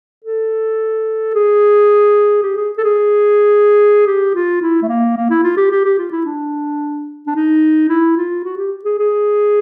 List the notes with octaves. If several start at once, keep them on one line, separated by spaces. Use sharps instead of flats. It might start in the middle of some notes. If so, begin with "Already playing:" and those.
A4
G#4
G4
G#4
A4
G#4
G4
F4
E4
A3
A#3
A#3
E4
F4
G4
G4
G4
F4
E4
D4
D4
D#4
E4
F4
F#4
G4
G#4
G#4